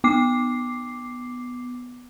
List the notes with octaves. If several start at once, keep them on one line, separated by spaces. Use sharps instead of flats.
B3 D6 C7